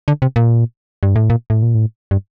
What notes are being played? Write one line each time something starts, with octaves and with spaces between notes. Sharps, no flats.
D3
C3
A#2
G2
A2
A#2
A2
A#2
A2
G2